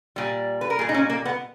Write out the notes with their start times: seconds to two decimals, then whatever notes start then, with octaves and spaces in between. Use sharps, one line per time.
0.16 A#2 G3
0.61 B4
0.70 A#4
0.79 A#2 G3 G#4
0.89 D#4
0.94 C#4
1.10 A#3
1.25 B3